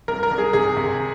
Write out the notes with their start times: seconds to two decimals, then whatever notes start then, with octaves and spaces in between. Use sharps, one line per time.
0.08 C2 A#4
0.23 A#4
0.31 C2
0.38 G#4
0.53 C3 G#4
0.77 C3